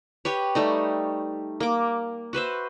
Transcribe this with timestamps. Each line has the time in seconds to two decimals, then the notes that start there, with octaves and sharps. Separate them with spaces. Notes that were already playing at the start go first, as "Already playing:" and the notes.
0.25 G4 B4 C#5
0.55 G3 A3 D#4
1.60 A#3 D6
2.33 F#4 B4 C5 E5